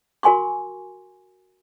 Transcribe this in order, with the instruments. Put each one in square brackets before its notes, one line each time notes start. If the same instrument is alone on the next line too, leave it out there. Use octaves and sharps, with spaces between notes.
[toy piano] F#4 A#4 G#5 C6 C#6